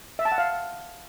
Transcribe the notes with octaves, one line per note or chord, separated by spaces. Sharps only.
E5
A5
F#5
F5